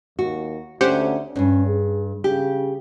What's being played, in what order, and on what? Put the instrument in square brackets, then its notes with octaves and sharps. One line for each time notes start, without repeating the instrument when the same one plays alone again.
[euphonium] D#2 [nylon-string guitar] F#4
[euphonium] D2 [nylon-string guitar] C#4 [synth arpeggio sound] G4 C5 F#5
[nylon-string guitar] E2 G2 [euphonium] C#4
[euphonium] G#4
[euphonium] C#3 [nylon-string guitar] G4